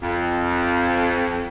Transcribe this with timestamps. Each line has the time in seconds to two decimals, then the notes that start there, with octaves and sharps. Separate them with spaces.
0.02 F2